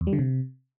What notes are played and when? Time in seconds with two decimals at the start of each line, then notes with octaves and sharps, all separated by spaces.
0.01 E2
0.07 G3
0.13 D3
0.19 C3